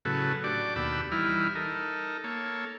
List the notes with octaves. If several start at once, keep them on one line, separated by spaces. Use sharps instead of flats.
A2 C#3 F#3 A4 B4
D4 F#4 G4 D5
D#2 B2 D4 G4 B5 E6
E3 G3 D#4 E4 F6
D#4 A4 A#4
A#3 A4 C#5